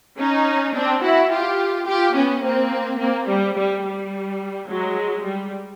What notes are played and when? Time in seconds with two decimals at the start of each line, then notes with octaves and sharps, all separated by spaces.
0.18 C#4 D#4
0.74 C4 D4
1.02 E4 F#4
1.30 F4 G4
1.86 F4 G4
2.14 B3 C#4
2.42 A#3 C4
2.99 A#3 C4
3.28 G3
3.56 G3
3.83 G3
4.68 F#3 G#3
5.24 G3